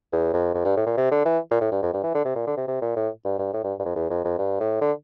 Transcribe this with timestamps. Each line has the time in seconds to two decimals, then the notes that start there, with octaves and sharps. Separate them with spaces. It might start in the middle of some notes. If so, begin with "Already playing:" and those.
0.12 E2
0.33 F2
0.54 F2
0.65 G2
0.76 A2
0.86 A#2
0.97 C3
1.11 D3
1.25 E3
1.51 A#2
1.61 A2
1.72 G2
1.82 F2
1.93 G2
2.03 E3
2.14 D3
2.25 C3
2.35 A#2
2.47 D3
2.57 C3
2.68 C3
2.82 A#2
2.96 A2
3.25 G2
3.39 G2
3.53 A2
3.64 G2
3.79 G2
3.85 F2
3.96 E2
4.10 F2
4.24 F2
4.38 G2
4.60 A2
4.81 D3